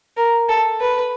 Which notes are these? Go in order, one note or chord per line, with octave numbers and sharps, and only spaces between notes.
A#4
A4
B4